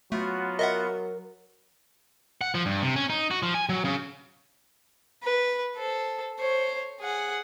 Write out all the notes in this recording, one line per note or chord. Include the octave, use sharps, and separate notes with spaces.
F#3 A3 B3 F4 F#4
A#4 D#5 E5 F#5
F#5
F3
G2
C3
C#4
D#4
F#4
F3
G#5
F#3
C#3
B4
A4 C5
C5 C#5
G#4 F#5